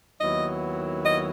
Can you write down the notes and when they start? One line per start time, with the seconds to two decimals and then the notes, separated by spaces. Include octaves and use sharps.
0.21 D#2 D#3 F#3 B3 E4 D#5
1.05 D#5